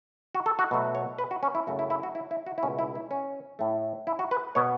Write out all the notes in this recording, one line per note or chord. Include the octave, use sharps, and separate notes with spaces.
F#4
A4
F#4
B2 F#3 A3
C#5
B4
F#4
C#4
E4
F#2 C#3 A3 F#4
E4
E4
F#4
E4
E4
F#4
E4
C#2 B2 A3 C#4
E4
E4
C#4
A2 A3
E4
F#4
B4
B2 B3 C#5